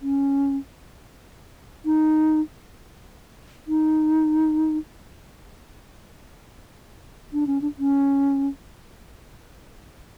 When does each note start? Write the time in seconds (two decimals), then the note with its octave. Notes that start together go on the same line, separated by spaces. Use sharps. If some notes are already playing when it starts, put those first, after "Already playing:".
0.02 C#4
1.85 D#4
3.68 D#4
7.33 D4
7.47 C#4
7.62 D4
7.79 C#4